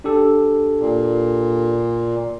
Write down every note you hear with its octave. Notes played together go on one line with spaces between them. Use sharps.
D4 G4 A4
A#2